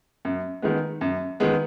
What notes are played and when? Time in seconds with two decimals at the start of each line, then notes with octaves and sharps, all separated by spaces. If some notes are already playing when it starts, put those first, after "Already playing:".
0.25 F#2
0.62 D#3 G#3 B3
1.01 F#2
1.40 D#3 G#3 B3